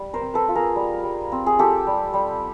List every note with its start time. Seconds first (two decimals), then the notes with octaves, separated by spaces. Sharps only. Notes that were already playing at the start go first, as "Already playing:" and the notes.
Already playing: G3
0.13 A#4 C5
0.21 C4
0.34 A4 B4
0.49 F4
0.55 G#4 A#4
0.76 G3
1.03 G3
1.32 C4
1.46 G#4
1.59 F4 G4 A4
1.87 G3
2.14 G3